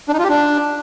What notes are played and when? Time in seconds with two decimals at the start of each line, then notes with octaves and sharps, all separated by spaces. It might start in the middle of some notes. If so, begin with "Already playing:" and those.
0.08 D4
0.14 D#4
0.19 F4
0.24 G4
0.29 D4